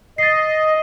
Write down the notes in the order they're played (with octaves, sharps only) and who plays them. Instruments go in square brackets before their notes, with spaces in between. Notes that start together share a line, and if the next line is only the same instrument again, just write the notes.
[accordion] D#5 [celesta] A6 C7